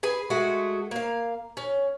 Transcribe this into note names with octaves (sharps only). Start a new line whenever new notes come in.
G#4 B4 G#5
G#3 A3 F#4 G#4
A#3 F5
C#4